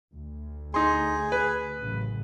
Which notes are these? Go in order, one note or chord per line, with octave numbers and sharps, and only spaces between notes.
D2
D#4 G#4 C6
B4
A1 F#2 C#3